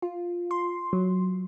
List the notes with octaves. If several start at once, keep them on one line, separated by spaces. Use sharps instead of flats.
F4
C6
F#3